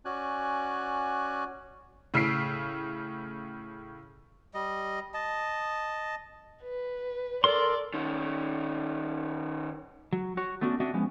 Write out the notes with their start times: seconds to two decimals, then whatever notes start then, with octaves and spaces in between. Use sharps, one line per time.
0.05 C#4 F#4 D5 G#5 F#6
2.14 A2 C#3 E6 B6 C7 D7
4.54 G3 D#5
5.14 D#5 A5
6.63 B4
7.44 A4 A#4 D5 C6
7.94 D#3 C#4
10.13 F#3
10.37 F#4 C#5
10.61 A3 B3 C#4 D4 E4 F#4
10.80 C4 D4 F#4 D#5 E5 F#5
10.93 F3 G#3 B3 C#4